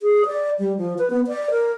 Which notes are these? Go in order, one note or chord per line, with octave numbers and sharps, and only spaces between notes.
G#4
D5
G3
F3
B4
B3
D5
A#4